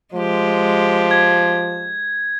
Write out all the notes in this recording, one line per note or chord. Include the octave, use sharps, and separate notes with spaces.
F3 G#3 G4
G#6